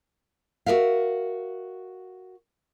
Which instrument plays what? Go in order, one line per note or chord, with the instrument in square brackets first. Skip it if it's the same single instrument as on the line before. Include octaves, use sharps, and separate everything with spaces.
[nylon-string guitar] F#4 G#4 A#4 E5 F5